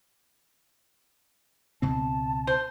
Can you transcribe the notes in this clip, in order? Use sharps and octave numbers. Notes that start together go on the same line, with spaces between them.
C#2 B2 C4 A5
C5